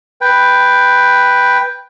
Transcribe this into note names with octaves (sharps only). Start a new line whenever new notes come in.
B4 G5